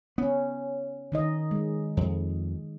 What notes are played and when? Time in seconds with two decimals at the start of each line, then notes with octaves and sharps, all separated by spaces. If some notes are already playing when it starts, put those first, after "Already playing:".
0.18 B3 C#4
1.12 D#3 D#4 D#5
1.51 G#3
1.97 F2